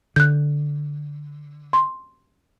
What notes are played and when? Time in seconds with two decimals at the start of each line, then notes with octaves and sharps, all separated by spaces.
0.16 D3 F#6 G6
1.73 C6